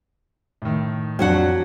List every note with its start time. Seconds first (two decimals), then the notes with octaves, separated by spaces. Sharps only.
0.62 A2 D#3
1.19 F2 F#3 D4 F#4 F#5 F#6